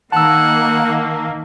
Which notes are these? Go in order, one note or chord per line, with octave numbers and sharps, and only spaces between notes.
D#3 A#3 F#5 A5 E6